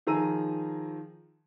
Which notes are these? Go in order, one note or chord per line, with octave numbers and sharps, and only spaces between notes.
D#3 F3 G#4 A#5 E6 D#7